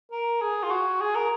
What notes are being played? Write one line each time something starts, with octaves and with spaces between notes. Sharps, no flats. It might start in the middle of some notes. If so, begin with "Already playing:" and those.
A#4
G#4
F4
F#4
G#4
A#4